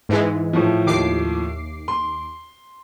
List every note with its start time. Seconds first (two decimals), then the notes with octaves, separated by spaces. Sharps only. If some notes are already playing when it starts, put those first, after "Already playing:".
0.09 G#2 E3 G#3
0.53 A2 F3
0.86 D#2 D6 C7
1.88 C6